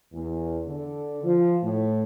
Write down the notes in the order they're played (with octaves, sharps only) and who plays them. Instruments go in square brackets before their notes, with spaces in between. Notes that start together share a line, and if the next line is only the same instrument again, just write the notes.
[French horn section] E2
D3
F3
A2